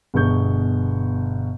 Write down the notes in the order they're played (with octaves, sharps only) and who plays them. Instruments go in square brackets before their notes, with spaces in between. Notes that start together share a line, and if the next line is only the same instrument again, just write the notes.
[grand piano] G1 B2 G#4 C#6 G6